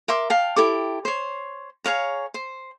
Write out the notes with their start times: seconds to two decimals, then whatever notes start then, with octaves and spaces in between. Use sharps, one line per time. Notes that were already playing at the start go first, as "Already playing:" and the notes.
0.08 A#4 E5 C6 D6
0.30 F5 G5 A5
0.56 E4 G4 A4 D6
1.05 C5 C#5
1.84 G#4 C#5 F5 A#5
2.34 C5